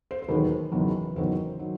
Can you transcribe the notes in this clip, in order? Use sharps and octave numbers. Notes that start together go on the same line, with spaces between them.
C5
C5
E1 D#2 D#3 F#3 B4
F#1 E2 D#3 F#3
F#1 E2 D#3 F#3 C5
D#3 F#3